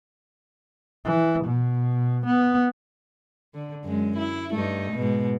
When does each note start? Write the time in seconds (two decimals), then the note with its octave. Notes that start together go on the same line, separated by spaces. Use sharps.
1.04 E3
1.44 B2
2.26 B3
3.54 D3
3.84 F#2 G#3
4.17 E4
4.52 G2 A3 D#4
4.92 G#2 B2